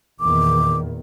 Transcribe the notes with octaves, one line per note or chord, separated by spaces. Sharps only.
E2 A#2 D#3 D6